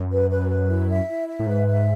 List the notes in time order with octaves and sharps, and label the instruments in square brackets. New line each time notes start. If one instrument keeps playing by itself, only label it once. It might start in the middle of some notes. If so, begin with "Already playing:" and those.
Already playing: [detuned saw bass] F#2
[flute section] B4
B4
B4
E4
E5
E4
E5
[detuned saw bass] A2
[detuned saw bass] G#2 [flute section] B4
[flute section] E5